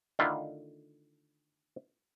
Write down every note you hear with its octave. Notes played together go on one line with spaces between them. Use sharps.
D3 D#3 A3 E4 F4